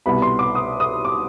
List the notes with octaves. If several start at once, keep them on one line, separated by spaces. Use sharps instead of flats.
C2 B2 G3 B3 B5
C6
D6
D#6
D#6
D6